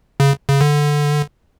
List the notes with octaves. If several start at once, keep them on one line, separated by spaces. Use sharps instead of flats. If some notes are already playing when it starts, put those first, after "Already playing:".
C#3
C#3
D3